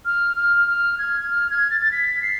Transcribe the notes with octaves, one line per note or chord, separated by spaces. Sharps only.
F6
F6
F6
G#6
F6
G#6
A6
A6
B6
C7